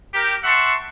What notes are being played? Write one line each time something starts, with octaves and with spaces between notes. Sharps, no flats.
G4 A#4
E5 F#5 A5 C6 C#6